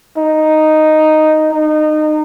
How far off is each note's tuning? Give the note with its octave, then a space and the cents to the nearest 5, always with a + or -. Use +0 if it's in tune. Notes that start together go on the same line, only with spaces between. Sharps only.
D#4 -5
D#4 -25